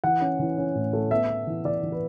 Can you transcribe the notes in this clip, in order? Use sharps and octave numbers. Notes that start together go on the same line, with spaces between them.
E3 F#5
C#4
E3
C#4
A2
A3
B3 E5
B3
E3
E3 D5
E3
B4